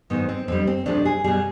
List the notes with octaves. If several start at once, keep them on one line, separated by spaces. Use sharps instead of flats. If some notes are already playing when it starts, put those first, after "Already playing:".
G#2 D#3 G#3 B3
C4
F2 D3 G3 C4
C4
D2 C3 F3 G#3 D4
G#4
B2 G3 G#4